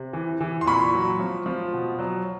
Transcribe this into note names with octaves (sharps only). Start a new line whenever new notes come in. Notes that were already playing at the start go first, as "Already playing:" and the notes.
Already playing: C3
E3
E3
C6
A#2 B5 C#6
F#3
F3
F3
B2
F#3